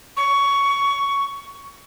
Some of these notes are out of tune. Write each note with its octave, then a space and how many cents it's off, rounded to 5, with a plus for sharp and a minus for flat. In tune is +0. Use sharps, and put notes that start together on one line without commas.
C#6 +15